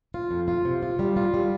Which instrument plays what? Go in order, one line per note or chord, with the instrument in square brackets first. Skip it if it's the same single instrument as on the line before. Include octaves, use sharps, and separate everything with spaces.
[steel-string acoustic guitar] F4
F2
F4
C3
F4
G3
F4
G3